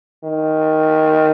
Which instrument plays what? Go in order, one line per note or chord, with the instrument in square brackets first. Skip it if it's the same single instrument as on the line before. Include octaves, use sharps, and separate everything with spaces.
[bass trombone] D#3